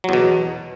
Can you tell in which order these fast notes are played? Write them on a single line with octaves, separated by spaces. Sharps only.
F#3 E2 B2